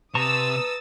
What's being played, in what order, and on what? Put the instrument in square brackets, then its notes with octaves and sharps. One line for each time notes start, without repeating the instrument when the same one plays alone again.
[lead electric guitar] C3 [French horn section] B4 [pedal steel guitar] A5 A#5 C#6 [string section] D#6 E6 A6